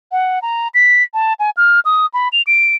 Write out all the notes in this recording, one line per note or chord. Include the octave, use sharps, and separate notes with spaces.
F#5
A#5
B6
A5
G#5
F6
D#6
B5
F7
D7